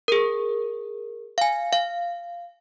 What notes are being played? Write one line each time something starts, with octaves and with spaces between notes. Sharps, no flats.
G#4 A#4
F5 G#5
F5